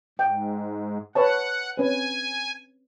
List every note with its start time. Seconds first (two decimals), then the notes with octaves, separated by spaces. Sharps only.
0.19 G#2 G5
1.15 B4 C#5 F#5 A5
1.77 C4 C#4 B4 G#5